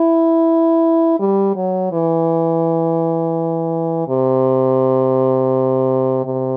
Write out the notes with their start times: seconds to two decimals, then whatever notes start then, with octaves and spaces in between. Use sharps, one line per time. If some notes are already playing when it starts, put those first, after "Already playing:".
Already playing: E4
1.19 G3
1.56 F#3
1.92 E3
4.08 C3
6.25 C3